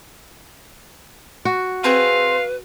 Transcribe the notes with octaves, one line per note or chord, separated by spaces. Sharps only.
F#4
C4 G#4 B4 F5